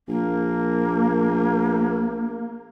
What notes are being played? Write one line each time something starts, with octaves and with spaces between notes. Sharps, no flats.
A#1 A#3